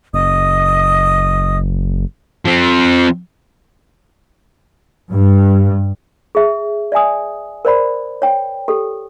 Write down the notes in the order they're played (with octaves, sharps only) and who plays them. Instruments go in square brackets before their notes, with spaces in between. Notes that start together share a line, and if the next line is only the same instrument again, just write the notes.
[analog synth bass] F#1 [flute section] D#5 D#6
[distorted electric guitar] F3 C4
[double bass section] G2
[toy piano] G#4 E5
D5 E5 G#5 D#6
A#4 C5 D5 B5
C#5 G5
G4 A4